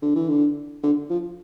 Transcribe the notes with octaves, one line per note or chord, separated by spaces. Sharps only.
D3
E3
D3
D3
F3